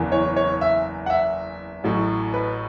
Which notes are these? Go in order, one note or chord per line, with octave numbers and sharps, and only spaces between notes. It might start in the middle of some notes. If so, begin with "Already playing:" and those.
Already playing: F#1 E2 E3
C#5
C#5
E5
F#5
E5
A1 A2 F#3
B4